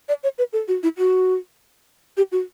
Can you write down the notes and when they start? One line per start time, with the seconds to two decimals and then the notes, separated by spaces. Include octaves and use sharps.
0.09 D5
0.23 C#5
0.38 B4
0.53 A4
0.68 F#4
0.83 E4
0.98 F#4
2.17 G4
2.32 F#4